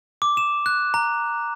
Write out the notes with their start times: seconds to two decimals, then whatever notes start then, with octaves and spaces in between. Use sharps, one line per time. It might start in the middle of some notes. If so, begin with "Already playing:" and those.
0.22 D6
0.37 E7
0.66 F#6
0.94 A#5